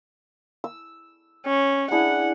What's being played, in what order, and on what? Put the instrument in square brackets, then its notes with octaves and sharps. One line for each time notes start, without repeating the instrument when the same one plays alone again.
[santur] E6
[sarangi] C#4
[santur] D4 E4 G#4 [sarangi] F#5